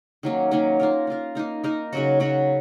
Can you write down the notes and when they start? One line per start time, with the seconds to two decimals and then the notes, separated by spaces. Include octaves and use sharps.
0.23 D#3 F#3 A#3 C#4
0.51 D#3 F#3 A#3 C#4
0.80 A#3 F4 A#4
1.07 A#3 F4 A#4
1.35 A#3 D#4 A#4
1.64 A#3 D#4 A#4
1.93 C#3 F#3 C#4 F#4
2.20 C#3 F#3 C#4 F#4